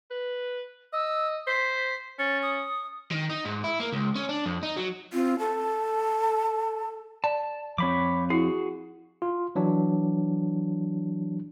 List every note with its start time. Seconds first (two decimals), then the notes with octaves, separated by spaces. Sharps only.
0.10 B4
0.93 D#5 E6
1.47 C5 B6
2.19 C#4 A6
2.42 D#6
3.12 D#3
3.29 D#4
3.45 G#2
3.64 E4
3.80 A#3
3.93 C#2
4.16 C#4
4.29 D4
4.46 F2
4.63 D#4
4.77 F#3
5.13 C4 F4
5.39 A4 A5
7.24 D5 A5
7.78 F3 C4 C#5 B5 D6
8.30 E4 F#4 G#4
9.22 F4
9.55 E3 F#3 D4